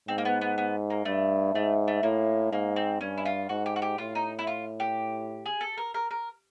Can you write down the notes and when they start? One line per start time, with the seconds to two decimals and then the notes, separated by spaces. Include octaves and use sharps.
0.08 G#2 C4
0.18 A#3
0.25 B3
0.41 B3
0.58 B3
0.90 A#3
1.05 G2 A3
1.54 G#2 A3
1.88 A3
2.03 A2 A#3
2.52 G#2 A#3
2.76 C4
3.01 G2 C#4
3.18 E4
3.25 F4
3.49 G#2 F#4
3.66 G4
3.76 F#4
3.82 G4
3.98 A2 F4
4.15 D#4
4.39 E4
4.47 F4
4.80 G4
5.46 G#4
5.61 A4
5.78 A#4
5.94 A#4
6.11 A#4